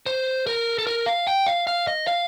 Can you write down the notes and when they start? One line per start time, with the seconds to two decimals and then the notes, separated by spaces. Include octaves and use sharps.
0.06 C5
0.47 A#4
0.78 A4
0.87 A#4
1.06 F5
1.27 G5
1.47 F5
1.67 F5
1.87 D#5
2.07 F5